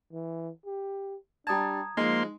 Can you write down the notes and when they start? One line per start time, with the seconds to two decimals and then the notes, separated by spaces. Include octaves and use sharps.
0.13 E3
0.66 G4
1.47 G3 D4 A5 A#5 D#6 G#6
1.97 F3 G#3 A#3 D#4 C6